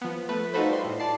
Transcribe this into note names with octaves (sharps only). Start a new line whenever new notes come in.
F3 B3
A3 B4
D#4 F4 F#4 A4 B4 C5
G3 C6
A2
D5 A5 C7